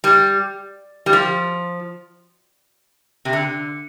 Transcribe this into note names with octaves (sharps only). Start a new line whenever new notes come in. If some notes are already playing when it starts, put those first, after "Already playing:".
G3
G3
F3
C3
D3